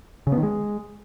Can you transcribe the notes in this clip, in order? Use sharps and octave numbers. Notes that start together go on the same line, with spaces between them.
C#3
B3
D#3
G#3